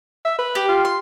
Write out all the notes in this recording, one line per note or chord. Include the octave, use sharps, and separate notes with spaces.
E5
B4
G4
F4
C6